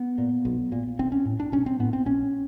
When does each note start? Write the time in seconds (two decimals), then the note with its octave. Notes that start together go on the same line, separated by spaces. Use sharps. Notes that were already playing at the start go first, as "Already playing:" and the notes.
Already playing: B3
0.18 A#2
0.45 B1
0.72 A#2
0.99 B1 C4
1.12 C#4
1.25 A2
1.40 D4
1.52 B1 C#4
1.66 C4
1.80 A2 B3
1.93 C4
2.06 A#1 C#4